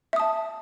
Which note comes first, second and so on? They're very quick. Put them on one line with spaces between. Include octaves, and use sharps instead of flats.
E5 D#6 A5